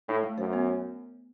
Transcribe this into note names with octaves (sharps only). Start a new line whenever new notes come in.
A2 D#4
A3
F#2 C5
B3